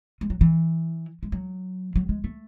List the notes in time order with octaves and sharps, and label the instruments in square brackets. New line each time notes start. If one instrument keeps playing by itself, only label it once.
[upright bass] G#3
F#3
E3
G#3
F#3
F#3
G#3
A3